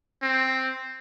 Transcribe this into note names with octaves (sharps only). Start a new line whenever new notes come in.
C4